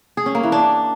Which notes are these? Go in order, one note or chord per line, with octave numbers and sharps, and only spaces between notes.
G#4
C#4
A#3
E3
D4